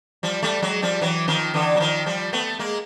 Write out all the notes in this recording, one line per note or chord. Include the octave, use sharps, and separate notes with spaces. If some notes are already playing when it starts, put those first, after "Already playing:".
F3 G3
G3 A3
F#3 G#3
F3 G3
E3 F#3
D#3 F3
D3 E3
F#3
D#3 F3
F3 G3
A3 B3
G#3 A#3